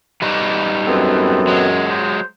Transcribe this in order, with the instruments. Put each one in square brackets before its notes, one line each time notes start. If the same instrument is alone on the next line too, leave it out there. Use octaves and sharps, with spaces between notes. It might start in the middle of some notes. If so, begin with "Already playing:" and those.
[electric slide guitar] G3 D#4 B4
[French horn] F#2 [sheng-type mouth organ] B3 C4 A4
[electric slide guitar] F#3 G#3
[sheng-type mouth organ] C5